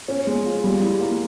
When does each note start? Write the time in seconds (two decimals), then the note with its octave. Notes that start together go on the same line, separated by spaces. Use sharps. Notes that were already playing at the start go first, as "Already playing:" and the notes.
0.08 C#4
0.27 G#3
0.46 F4
0.64 G3
0.82 E4
1.01 A#3